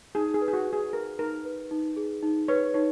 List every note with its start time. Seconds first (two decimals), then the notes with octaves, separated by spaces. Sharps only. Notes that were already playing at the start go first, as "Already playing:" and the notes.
0.15 D#4 G#4
0.34 G#4
0.41 B4
0.48 G#4
0.53 F#4
0.67 D#4
0.73 G#4
0.93 G#4 A#4
1.19 D#4 A#4
1.45 B4
1.71 D#4
1.97 G#4
2.23 D#4
2.48 B4 C#5
2.74 D#4 C#5